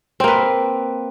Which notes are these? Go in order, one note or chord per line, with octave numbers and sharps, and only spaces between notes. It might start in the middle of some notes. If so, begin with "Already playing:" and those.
A#3 C4 B4